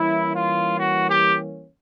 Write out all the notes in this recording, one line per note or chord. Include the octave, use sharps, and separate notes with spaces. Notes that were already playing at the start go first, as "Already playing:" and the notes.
Already playing: E3 G3 A#3 C#4 E4
F4
F#4
G4